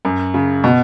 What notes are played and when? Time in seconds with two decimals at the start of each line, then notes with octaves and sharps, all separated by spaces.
0.05 F#2
0.34 C#3
0.64 B2